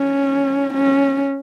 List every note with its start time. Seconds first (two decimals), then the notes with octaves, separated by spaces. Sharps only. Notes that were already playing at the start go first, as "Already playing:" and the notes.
Already playing: C#4
0.74 C#4